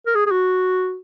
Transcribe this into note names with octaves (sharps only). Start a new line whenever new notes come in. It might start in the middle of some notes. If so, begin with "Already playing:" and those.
A#4
G#4
G#4
F#4